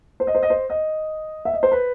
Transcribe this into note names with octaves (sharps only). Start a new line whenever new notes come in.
C5
D#5
C5
D#5
C5
D#5
E5
D#5
C5
B4